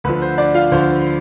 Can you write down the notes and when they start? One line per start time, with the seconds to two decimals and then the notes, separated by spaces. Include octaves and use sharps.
0.04 D2 D3 F3 B4
0.22 C5
0.38 D4 D5
0.54 F4 F5
0.71 D2 D3 F3 C5